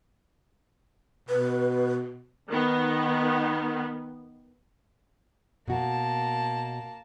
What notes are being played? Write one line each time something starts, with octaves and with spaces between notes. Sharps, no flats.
B2 B4
D#3 B3
B2 A#3 F#4 A5